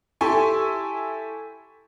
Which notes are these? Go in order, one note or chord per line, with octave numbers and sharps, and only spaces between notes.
E4 G4 A4 G#5 C6 C#6